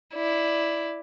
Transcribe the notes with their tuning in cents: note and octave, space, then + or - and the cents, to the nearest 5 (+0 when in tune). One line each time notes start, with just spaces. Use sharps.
E4 +0 D5 +0